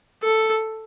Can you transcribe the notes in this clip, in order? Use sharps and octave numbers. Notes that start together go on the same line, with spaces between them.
A4